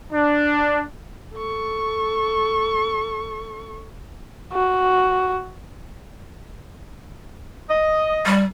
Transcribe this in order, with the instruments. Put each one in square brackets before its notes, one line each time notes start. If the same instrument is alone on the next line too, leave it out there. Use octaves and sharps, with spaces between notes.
[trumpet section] D4
[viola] A4 C#6
[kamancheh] F#4
[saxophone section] D#5
[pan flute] G3